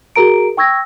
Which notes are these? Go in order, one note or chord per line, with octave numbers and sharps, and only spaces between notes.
F#4 G#4 A#4 A#5 D7
G5 C#6 E6 G#6 A#6